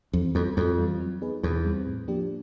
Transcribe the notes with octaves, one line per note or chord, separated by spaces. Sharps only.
F2 E3
F2 G3 B3
F2 A2
E3 G3 C4 F4
F#3
B3 D#4 G#4 B4
E2 B2
G3 C4
A2
F3 A#3 D4 G4